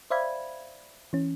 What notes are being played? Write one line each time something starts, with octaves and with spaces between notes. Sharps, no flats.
C5 D5 E5 F5 B5 G#6
E3 C#4